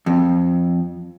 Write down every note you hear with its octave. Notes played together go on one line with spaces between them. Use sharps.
F2